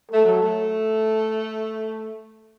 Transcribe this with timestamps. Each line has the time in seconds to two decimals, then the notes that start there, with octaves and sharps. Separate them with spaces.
0.12 A3 A4
0.25 F#3
0.39 A3